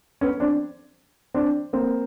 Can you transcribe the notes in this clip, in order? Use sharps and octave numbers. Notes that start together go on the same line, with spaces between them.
B3 C#4
C4 D4
C4 D4
A#3 C4